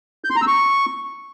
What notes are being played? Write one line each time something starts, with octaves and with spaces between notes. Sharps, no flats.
G6
C6
A#5
E6
C#6